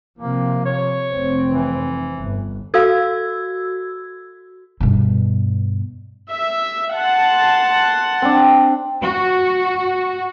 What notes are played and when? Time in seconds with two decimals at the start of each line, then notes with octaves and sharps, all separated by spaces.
0.19 C3 F3 A#3
0.66 C#5
1.13 F1 C4
1.49 E3
2.17 G1
2.74 F#4 A4 F5 E6 G#6
4.80 G2 B2
6.31 E5
6.94 F#5 A5 C6
8.22 C4 D4
9.02 F#4